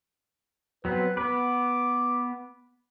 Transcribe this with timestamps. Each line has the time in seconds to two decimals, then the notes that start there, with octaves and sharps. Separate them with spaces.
0.85 F#3 B3 C4 B4
1.17 B3 B4 D6